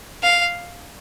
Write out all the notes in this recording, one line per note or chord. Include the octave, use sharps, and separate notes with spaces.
F5